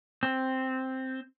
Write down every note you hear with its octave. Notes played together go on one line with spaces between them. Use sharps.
C4